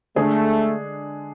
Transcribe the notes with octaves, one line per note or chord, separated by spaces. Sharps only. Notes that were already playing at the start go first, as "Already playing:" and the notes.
D3 G#3 A3 D4 G#4